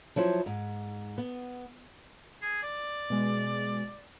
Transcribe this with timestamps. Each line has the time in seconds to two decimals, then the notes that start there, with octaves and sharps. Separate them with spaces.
0.16 F3 F#3 E4 C5
0.46 G#2
1.18 B3
2.42 G#4
2.63 D5
3.10 B2 G#3